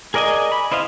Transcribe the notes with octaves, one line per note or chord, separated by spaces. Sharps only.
G#4 A#4 D5 D#5 G#5
B5
E4 C5 D#5 F5